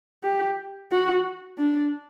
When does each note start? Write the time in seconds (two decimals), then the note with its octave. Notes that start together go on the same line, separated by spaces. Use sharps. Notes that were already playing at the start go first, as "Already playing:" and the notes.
0.23 G4
0.92 F#4
1.58 D4